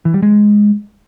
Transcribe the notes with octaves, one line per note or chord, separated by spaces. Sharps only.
E3
G3
G#3